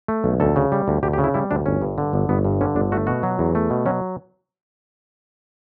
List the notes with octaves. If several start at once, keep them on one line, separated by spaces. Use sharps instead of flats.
A3
B1
D2 A4
C#3
G3
D2
D2 G4
G4
C#3
E4
G3 E4
D2 D4
G1 C#4
G2
D3
G1
G1 B3
G2
D3 C#4
G1 D4
A3 F#4
B2 F#4
F#3
E2
A3
B2
F#3 C#4